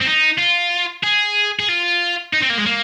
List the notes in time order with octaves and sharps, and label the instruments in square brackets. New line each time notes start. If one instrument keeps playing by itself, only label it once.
[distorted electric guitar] C4
D#4
F4
G#4
G#4
F4
D#4
C4
A#3
G#3
A#3